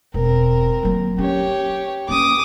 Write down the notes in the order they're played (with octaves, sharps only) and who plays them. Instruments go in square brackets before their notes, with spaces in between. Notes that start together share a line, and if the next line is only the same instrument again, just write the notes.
[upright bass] E1 [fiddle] C4 A#4
[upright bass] F#3 A#3
[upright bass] C#4 [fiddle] G4 C#5
[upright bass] A#3 C#4 [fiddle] D6 D#6